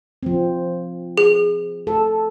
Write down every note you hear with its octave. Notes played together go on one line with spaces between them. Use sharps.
F3 C4
G#4
A4